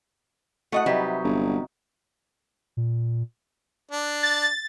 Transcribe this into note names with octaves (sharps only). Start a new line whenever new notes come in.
A3 E4 F#4 D#5 F#5
C3 F#3 G3 D#4 B4
G1
A#2
D4
A6